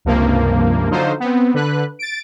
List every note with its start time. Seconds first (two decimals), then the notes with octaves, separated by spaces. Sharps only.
0.05 C#2 G2 C3 F3 A#3
0.91 D3 F3 F#3 D#4 F4 C5
1.20 B3 C4
1.54 D3 B4 F#6
1.99 A6 D7